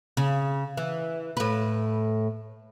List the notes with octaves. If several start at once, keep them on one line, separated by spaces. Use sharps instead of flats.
C#3
E3
A2 B4